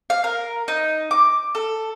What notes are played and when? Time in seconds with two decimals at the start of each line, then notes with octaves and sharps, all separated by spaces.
0.10 F5
0.24 A#4
0.68 D#4
1.11 D6
1.55 A4